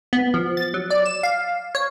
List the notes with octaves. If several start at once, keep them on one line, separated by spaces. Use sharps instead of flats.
B3
F3
A6
F#3
D5
E7
F5
C#5